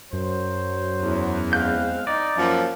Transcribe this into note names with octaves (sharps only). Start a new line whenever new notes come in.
F#2 F#3 C5
E2
G#3 C4 F5 F#6 G6
D#4 D5
F#2 F3 A#3